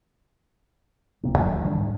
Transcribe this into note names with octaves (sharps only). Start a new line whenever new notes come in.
D#1 C3 A#3
F#2 D#3 F3 F#3
D2
D#3 G3 D4
G#2